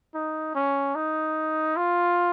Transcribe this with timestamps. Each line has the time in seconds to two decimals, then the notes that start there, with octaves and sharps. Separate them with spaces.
0.15 D#4
0.55 C#4
0.95 D#4
1.77 F4